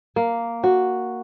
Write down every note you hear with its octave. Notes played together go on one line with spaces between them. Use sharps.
A#3
F#4